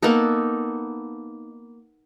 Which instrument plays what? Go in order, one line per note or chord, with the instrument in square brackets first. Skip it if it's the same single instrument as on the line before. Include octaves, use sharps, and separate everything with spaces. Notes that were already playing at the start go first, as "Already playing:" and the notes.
[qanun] A#3 B3 D#4 A4